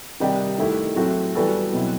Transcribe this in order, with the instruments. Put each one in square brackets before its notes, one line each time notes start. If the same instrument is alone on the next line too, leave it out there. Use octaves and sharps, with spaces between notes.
[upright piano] C3 D#3 G3 D#4 G4
D#3 A3 E4 G4
A2 F#3 C4 F#4 A4
E3 G3 B3 F#4 A4
B2 F#3 C4 E4